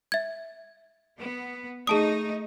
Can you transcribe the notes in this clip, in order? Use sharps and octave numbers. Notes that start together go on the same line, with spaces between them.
E5 G#6
B3
A3 D#4 G#4 A5 D#6